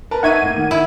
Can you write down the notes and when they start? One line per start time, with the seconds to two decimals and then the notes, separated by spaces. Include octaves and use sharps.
0.11 A#4 B4 A5
0.23 D#4 E5 F#5 C#6 G#6 D#7
0.42 A2 A#3
0.56 D#3
0.71 E4